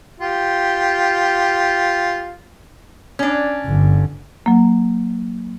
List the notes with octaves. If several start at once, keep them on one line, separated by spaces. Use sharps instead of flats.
F4 G4
C#4 D4
G1 D3
F#3 A#3